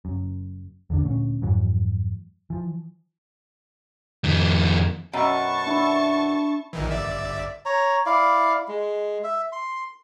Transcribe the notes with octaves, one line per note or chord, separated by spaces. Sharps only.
F#1 F#2
E2 D3 D4
D2 A#2 C#4
F2 G#2 E3 F#3
E3 F3
F2 D#3
F#2 B2 A5 C#6
D4 E4
A#1 D#3 E3
G1 D5 E5
C#5 A#5
E4 D5 F5
G#3
E5
C6